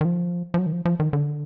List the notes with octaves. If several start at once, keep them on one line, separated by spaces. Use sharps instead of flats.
D#3
F3
F3
F#3
D#3
F3
F3
D#3
D3